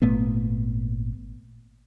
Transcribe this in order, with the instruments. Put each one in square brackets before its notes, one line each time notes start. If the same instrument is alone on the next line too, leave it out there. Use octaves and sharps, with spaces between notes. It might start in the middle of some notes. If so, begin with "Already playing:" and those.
[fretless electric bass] G#1 A#2 A3 B3